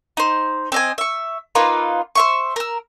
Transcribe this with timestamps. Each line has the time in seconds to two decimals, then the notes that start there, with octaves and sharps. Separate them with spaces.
0.17 D#4 C5
0.72 C4 D#5 G#5
0.98 E5 C#6
1.55 A#3 D#4 F4 B4
2.15 C5 E5 C#6
2.56 A#4 E6